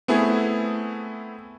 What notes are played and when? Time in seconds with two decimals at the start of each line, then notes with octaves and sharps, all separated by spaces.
0.08 A3 B3 C4 E4 G#4